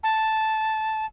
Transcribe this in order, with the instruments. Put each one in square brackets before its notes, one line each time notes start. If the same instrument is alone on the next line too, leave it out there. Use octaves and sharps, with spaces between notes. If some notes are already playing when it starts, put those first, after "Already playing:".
[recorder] A5